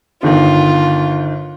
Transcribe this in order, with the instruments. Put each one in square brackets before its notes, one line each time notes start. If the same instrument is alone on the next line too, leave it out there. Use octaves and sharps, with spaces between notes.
[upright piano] G1 D3 D#3 [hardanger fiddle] F4